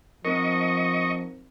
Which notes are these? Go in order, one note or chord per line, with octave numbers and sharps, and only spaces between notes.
F3 C4 D#4 A#4 D#5 C#6